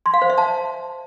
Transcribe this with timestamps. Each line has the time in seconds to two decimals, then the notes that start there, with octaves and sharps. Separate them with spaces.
0.06 C6
0.14 F5
0.22 C5
0.30 E5
0.38 A5